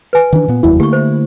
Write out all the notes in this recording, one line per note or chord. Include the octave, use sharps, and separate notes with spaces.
B4 G#5
D#3 E3 D4
A#2 B3
F1 D#2 F#3 E4
D3 A3 A#3 G4 C#6
C5